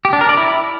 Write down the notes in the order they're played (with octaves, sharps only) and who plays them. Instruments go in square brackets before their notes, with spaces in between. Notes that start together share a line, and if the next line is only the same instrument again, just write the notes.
[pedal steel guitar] G4
D4
A#4
D5
E4